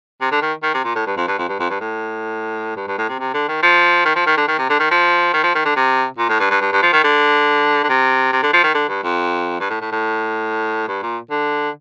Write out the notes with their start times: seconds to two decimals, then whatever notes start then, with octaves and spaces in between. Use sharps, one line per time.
0.21 C3
0.32 D3
0.42 D#3
0.63 D#3
0.74 C3
0.85 A#2
0.96 A2
1.07 G2
1.17 F2
1.28 G2
1.38 F2
1.49 G2
1.60 F2
1.70 G2
1.81 A2
2.77 G2
2.88 G2
2.98 A2
3.09 C3
3.19 C3
3.34 D3
3.49 D#3
3.63 F3
4.05 D#3
4.16 F3
4.26 D#3
4.37 D3
4.48 D#3
4.58 C3
4.70 D3
4.80 D#3
4.91 F3
5.33 D#3
5.43 F3
5.55 D#3
5.65 D3
5.76 C3
6.18 A#2
6.29 A2
6.40 G2
6.50 G2
6.61 G2
6.72 G2
6.82 F3
6.93 D#3
7.04 D3
7.84 D3
7.89 C3
8.32 C3
8.43 D3
8.53 F3
8.64 D#3
8.74 D3
8.89 G2
9.03 F2
9.60 G2
9.70 A2
9.81 A2
9.92 A2
10.88 G2
11.03 A#2
11.30 D3